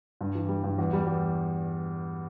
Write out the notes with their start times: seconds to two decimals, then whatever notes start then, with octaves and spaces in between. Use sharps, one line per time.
0.21 G2
0.35 E3
0.49 G3
0.64 G2
0.78 E2
0.93 G3
1.07 E2